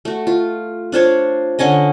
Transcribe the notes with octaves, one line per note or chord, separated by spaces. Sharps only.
A3 F#4
F4
D4 F4 C5 C#5
D3 C#4 C#5 D#5